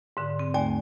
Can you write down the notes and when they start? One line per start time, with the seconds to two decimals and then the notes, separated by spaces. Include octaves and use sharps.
0.17 G#2 D3
0.39 C4
0.54 D#2 A3 D5 G#5